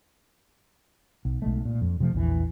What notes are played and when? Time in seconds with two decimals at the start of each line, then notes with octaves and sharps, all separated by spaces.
1.25 B1
1.42 B1 G#3 A3
1.65 A#2
1.81 F2
2.00 C3 F3 A3
2.13 A#1 E2 E3